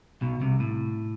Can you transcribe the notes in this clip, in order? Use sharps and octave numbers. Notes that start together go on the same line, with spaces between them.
B1 B2
C2 C3
A2